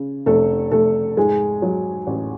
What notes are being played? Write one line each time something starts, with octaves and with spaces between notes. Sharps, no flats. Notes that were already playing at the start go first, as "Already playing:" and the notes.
Already playing: C#3
F1 A3 A4
F1 A3 A4
G#2 G#3 G#4
F#3
A1